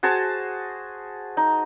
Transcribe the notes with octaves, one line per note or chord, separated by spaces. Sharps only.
F#4 G#4 C5 A5
D#4